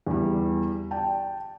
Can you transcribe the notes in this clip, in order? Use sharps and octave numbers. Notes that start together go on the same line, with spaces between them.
E2 G3
D5 G5 A5